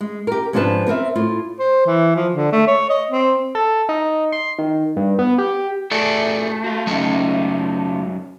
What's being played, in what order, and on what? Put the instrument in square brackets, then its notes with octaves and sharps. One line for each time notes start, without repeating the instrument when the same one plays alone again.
[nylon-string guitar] G#3
G4 A#4
G#2 C3 F3 D4 B4 A5
B3 C4 A#4 E5
A2 F4
[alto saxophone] C5
E3
F3
D3
A3
C#5
D#5
C4
[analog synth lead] A4
D#4
C6
D#3
G2
B3
G4
[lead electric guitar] A3 [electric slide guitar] F#4 G#4 A4 [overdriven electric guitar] D5
[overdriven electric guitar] F#4 F5
[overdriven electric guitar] F#2 D#4 [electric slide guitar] G#3 C#4